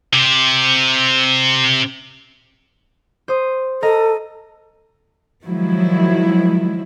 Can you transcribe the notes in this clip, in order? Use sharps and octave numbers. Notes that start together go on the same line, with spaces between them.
C3 G4
C5 D#6
A4 A#4 D#5 A#5
D#3 F3 F#3 G#3 E4